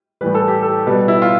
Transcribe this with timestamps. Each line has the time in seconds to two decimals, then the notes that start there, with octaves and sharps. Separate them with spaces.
0.21 A2 E3 G3 B4
0.35 A4
0.48 G4
0.62 A4
0.86 B2 G3 B4
1.08 E4
1.22 F4